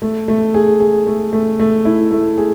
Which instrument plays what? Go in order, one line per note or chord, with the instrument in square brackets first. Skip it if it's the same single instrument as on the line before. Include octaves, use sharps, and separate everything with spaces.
[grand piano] A3
A3
G#4
G#4
A3
A3
A3
E4
A3
G#4